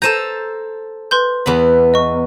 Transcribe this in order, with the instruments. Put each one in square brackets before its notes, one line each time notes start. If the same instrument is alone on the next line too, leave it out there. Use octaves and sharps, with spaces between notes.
[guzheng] A4 C5 A#5 [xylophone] G6 D#7 E7
[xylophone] B4 C6 G6
[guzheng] E2 B3 B5
[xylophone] D#5 C#6